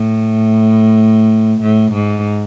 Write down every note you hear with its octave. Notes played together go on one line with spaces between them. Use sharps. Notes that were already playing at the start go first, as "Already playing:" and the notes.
Already playing: A2
A2
G#2